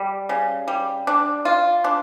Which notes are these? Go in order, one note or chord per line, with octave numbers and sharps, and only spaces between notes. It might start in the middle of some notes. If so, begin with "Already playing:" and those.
Already playing: G3
C#3
G3
D4
F4
D4